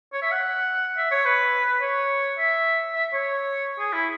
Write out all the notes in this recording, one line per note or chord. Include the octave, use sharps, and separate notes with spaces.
C#5
E5
F#5
E5
C#5
B4
C#5
E5
E5
C#5
G#4
E4